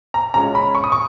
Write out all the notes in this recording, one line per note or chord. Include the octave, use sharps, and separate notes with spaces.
A#5
C#3 G#3 C#4 F4 A#5
B5
C#6
D#6
C#6